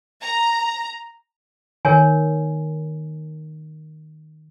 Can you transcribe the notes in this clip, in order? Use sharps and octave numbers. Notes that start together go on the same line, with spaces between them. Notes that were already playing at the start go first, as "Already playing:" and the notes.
A#5
D#3 A#4 C#5 G#5